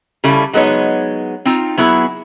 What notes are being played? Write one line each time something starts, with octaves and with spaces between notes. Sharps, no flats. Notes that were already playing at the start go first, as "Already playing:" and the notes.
C#3 G3 E4 A4
F#3 G#3 B3 D#4 C#5
C4 D#4 F4
F#3 B3 E4 G#4